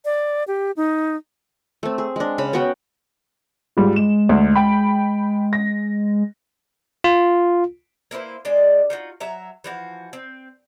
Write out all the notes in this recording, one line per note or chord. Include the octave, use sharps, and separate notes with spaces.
D5
G4
D#4
A3 C4
G#4
G#3 D4
C#3 B5
B3 C#4 F#4 G5
G#2 G3 F4
G#3 E7
D2
G5 B5
A#6
F4
A#3 E4 B4 C5
G#3 D4 D5 D#5
D#4 F4 F#4
F#3 E5 A#5
E3 F3 F#4
C4